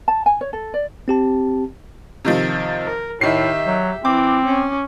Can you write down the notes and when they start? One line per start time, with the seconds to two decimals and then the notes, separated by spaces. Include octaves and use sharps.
0.08 A5
0.26 G#5
0.41 C#5
0.53 A4
0.74 D5
1.08 C4 G4 A5
2.25 C3 D#3 F3
2.86 A#4
3.21 A2 D#3 G4 E5 C7
3.67 F#3
4.05 E3 C4 D6
4.45 C#4